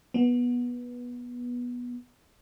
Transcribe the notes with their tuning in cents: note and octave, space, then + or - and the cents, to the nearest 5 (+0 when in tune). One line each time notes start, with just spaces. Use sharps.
B3 -15